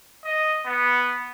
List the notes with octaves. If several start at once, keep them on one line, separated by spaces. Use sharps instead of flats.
D#5
B3